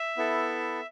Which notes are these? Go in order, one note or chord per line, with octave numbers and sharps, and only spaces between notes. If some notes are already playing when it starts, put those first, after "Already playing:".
Already playing: E5
B3 E4 A4